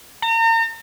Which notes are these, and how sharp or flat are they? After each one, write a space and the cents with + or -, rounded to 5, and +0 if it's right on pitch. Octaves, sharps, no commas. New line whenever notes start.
A#5 -40